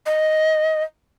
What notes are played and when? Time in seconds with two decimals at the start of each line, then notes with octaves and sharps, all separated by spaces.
0.06 D#5